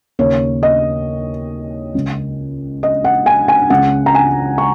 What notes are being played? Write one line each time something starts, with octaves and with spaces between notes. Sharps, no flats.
D#2 C#3 C#5
D#5
C#2 C#3
D#5
F#5
G#5
G#5
C#2 C#3 F#5
A#5
G#5
C#6